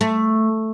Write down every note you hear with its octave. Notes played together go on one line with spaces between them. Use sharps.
A3